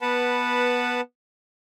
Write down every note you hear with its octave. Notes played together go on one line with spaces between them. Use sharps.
B3 B4 F#5 A5 B5